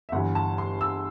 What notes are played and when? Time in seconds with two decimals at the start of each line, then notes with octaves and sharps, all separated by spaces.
0.09 E5
0.12 G1 G2 E3 F#5
0.35 A5
0.58 C6
0.81 E6